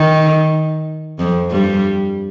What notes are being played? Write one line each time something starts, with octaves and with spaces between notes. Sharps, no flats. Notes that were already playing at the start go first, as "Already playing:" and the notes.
Already playing: D#3
F2 F3
G2 G3